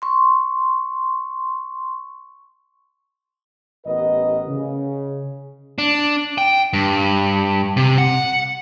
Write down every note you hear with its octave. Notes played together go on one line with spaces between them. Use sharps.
C6 C#6
A1 B3 G4 A#4 B4 D#5
C#3
D4
G5
G2
C3
F#5